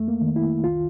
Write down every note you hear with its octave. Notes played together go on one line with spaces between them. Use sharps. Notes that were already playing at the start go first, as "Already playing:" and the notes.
Already playing: F2 A3
A#3
D#3
E4
C2 F4